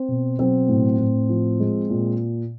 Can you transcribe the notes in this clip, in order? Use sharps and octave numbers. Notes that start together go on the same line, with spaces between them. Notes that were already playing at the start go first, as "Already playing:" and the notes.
Already playing: C4
B2
F#3 C4
A2
A2
F3
G#3
A#2